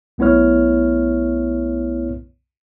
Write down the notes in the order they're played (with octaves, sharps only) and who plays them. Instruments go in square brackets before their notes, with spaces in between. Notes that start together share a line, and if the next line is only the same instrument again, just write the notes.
[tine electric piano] B1 A3 B3 E4 C#5 F6